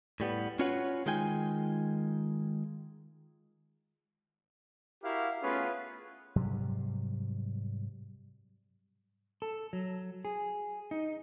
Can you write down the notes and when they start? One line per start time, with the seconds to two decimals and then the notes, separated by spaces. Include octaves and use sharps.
0.20 A2 G3 B3
0.59 C#4 F4 F#4 B4 C#5 F#5
1.06 D#3 G#3 F4 G5 G#5
5.04 E4 F#4 G4 A#4 F5
5.43 A3 B3 C#4 F4 G#4 B4
6.36 G#2 C3 F#3 G3
9.42 A4
9.73 F#3
10.25 G#4
10.91 D#4